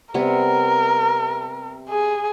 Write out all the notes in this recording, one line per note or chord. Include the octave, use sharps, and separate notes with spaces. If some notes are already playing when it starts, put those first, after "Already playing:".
C3 G3 B3 A#4
G#4